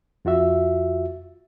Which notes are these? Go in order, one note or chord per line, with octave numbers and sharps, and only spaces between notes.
F2 F4 F#4 E5